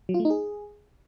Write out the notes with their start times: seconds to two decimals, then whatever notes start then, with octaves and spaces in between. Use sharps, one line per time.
0.09 F#3
0.14 F4
0.20 A3
0.25 D#4
0.30 G#4